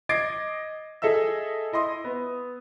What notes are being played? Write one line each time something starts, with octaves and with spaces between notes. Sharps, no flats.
D#5 D6 G#6 A6 C7 D7
G#4 A4 D#5 E5 E6
E4 D#5 C6 D#6
B3